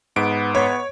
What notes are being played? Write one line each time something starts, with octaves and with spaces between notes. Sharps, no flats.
G#2 B3 D7
B3 C#5